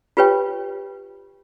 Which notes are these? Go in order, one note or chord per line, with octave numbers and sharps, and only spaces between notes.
F4 G4 B4 C#5 G5